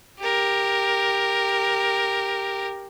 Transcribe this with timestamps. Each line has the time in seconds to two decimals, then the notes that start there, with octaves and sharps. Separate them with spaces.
0.19 G4 A#4